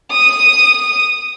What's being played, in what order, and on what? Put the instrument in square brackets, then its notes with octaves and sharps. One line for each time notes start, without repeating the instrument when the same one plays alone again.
[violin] D#6